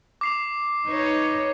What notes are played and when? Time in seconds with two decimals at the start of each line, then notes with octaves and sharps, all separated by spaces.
0.21 D6 C7 F7
0.87 D#4 B4 C#5